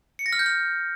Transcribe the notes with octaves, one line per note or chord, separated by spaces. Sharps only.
C#7
A#6
F6
G6
F6